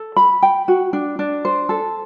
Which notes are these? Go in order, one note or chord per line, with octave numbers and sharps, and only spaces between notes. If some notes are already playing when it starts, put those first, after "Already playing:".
Already playing: A4
B5
G5
F#4
D4
D4
C5
A4